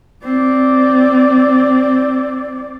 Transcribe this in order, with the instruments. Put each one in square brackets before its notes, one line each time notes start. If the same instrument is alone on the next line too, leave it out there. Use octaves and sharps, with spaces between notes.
[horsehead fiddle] C4 D5